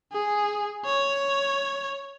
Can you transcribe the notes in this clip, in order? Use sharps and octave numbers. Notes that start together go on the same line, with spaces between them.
G#4
C#5